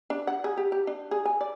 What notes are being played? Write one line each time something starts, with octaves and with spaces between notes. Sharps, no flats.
D4
F#5
G#4
G4
G4
D4
G#4
G#5
D5